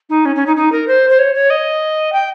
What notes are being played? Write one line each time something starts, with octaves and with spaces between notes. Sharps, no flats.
D#4
C#4
C#4
D#4
D#4
A#4
C5
C5
C#5
C#5
D#5
G5